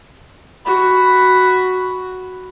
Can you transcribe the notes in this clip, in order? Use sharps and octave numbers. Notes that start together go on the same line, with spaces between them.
F#4 B5